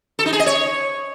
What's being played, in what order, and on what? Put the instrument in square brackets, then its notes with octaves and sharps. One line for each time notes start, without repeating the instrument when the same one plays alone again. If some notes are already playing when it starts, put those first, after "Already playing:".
[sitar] A4
D#4
G#4
D#5
C#5